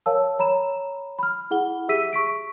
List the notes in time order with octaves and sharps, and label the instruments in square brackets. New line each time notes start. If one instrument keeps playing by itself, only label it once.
[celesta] A#4 C#5 F5 A5 E6
C#5 A#5 B5 E7
B5 F6
E4 G#4 F#5 G7
G4 G#4 E5 E6 B6 D#7
C#6 B6 D7